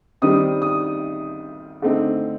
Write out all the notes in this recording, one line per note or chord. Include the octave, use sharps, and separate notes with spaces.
D#3 G3 C4 D#4 D#6
D#6
D3 A3 C4 D#4